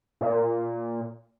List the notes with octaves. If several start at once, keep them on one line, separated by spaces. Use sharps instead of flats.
A#2